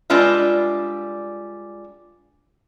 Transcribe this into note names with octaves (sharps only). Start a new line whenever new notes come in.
G3 G#3 D4 F4 B4 E5